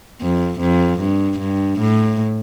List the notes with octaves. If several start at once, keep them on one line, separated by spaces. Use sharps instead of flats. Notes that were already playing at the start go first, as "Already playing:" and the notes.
F2
F2
G2
G2
A2